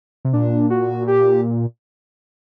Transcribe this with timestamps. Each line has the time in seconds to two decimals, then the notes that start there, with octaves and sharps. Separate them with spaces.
0.25 C3
0.33 A#2 D4
0.70 F#4
1.08 G4